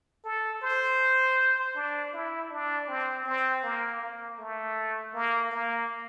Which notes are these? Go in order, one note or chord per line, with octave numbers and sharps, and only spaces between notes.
A4
C5
D4
E4
D4
C4
C4
A#3
A#3
A3
A#3
A#3